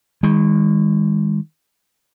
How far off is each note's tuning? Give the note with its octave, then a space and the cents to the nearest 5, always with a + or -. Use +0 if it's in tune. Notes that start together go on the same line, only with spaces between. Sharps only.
D#3 +25 G#3 -30